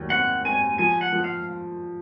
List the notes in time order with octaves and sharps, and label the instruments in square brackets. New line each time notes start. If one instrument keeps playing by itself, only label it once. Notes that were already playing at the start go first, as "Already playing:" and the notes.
Already playing: [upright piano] D#2 F#3
[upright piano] C4 [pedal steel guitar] F#5
[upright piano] C4 [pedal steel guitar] G#5
[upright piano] F3 [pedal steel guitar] G#5
[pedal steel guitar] F#5
[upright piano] F3
[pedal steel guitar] F5